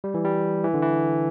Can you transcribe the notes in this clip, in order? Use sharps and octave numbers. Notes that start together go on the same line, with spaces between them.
G3
E3
G3
E3
D3
E3